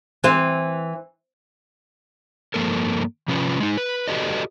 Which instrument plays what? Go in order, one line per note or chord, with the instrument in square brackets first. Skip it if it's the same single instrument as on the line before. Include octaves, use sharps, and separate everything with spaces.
[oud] E3 C4
[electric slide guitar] G2 F3 A#3 A4 A#4
C3 F3 C#4 F4 B4
G#3 D#4
B4
F#4 G4 A4 B4 D5 D#5